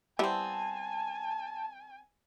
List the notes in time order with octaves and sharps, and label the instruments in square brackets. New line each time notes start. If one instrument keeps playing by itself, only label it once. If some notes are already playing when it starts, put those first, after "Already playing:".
[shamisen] G3 E4 [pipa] B3 C4 [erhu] G#5 [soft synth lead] A5